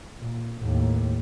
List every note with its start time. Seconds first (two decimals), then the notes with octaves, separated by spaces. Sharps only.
0.19 A#2
0.62 D#2 A2